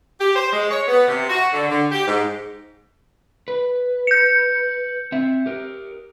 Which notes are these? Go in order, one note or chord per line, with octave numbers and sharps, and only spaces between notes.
G4
C5
G#3
C#5
B3
C3
F#4
D3
D3
G4
G#2
B4
G6 C#7
C4 E5
G4 A#4